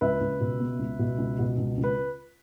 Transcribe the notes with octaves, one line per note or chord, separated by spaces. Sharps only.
C#2 B4 E5
C#2
B2
B3
C#2
B2
C#2
B2
C#2
C#2
B4